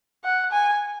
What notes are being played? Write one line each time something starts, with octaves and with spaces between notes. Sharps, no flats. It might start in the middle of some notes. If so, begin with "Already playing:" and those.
F#5
G#5